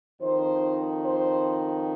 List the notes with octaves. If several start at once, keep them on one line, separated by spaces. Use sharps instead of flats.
F2 D#3 C5
C5